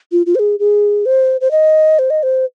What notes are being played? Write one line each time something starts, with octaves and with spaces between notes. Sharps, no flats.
F4
F4
C5
G#4
G#4
C5
C5
D#5
C5
D#5
C5